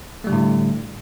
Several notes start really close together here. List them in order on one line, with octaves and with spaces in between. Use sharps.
A3 G3 D3 A2